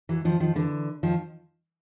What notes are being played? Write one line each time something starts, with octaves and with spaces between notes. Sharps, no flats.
E3 F#3
D#3 F3
D#3 F3
D3 E3
D#3 F3